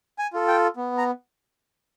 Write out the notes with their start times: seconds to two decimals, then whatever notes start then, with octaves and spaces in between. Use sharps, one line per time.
0.19 G#5
0.33 F4 A4
0.48 G5
0.77 B3
0.98 A#5